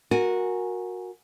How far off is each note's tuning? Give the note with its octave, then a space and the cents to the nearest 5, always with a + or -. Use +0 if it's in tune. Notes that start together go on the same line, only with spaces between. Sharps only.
F#4 -15 A#4 +0 G#5 -5